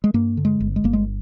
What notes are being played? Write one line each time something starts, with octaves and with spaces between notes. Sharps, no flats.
G#3
G2 A#3
D3
G#3
G1
G#3
G1 A#3
G#3